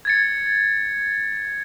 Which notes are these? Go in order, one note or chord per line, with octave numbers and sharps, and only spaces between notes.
G#6 A6 C#7